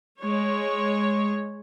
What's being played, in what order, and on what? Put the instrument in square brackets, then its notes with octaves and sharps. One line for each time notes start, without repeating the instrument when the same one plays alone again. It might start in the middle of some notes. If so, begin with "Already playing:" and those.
[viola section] G#3 C#5